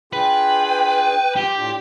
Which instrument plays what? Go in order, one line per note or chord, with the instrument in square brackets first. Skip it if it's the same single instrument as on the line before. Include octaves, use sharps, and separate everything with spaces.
[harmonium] D4 F4 G#4 [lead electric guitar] B4 [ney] G5
[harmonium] F4 [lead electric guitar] G4
[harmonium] A2 D4 F4